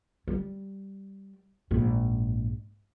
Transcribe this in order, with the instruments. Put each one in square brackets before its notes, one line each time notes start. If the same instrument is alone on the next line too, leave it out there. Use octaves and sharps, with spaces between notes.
[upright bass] G3
A#1 G#2